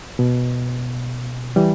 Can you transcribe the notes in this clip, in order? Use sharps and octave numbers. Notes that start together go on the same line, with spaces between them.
B2
E3 G3